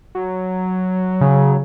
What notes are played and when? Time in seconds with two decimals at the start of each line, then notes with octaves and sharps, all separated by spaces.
0.15 F#3
1.21 C#3